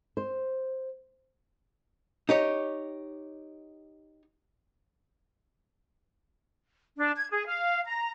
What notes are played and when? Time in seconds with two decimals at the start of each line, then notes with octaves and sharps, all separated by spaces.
0.17 C5
2.29 D#4 G4 C#5
6.98 D4
7.17 G#6
7.30 G#4
7.46 F5
7.85 A#5